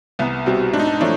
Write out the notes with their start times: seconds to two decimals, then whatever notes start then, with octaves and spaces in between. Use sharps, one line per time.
0.19 C2 B3
0.46 B2 G3 C4
0.73 G#2 D4
0.80 D#4
0.87 D4
1.00 F3 A3 C#4 D4 E4